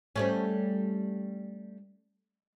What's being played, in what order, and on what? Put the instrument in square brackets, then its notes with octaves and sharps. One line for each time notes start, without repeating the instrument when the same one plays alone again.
[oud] G3 A3 C#4